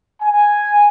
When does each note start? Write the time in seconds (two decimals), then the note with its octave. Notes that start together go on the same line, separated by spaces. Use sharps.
0.23 G#5